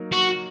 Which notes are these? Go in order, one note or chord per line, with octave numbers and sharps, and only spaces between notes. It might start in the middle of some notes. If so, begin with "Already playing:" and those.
Already playing: F#3 A#3 D#4 A#4
F#4